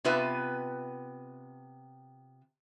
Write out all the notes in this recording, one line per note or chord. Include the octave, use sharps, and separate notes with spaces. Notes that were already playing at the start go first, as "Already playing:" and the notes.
C3 B3 F4 B4 E5